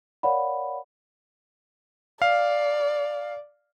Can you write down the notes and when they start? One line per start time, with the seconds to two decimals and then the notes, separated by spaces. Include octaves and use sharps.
0.23 A#4 C#5 D5 F5 F#5 B5
2.22 D5 F5